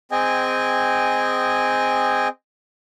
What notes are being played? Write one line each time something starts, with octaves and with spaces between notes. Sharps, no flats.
C4 G#4 D#5 G5 G#5